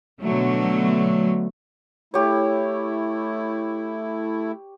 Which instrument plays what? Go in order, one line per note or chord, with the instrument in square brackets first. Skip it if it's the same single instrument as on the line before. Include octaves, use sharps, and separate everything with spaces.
[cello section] B2 D3 F#3 A3
[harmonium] A3 E4 [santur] G4 C#5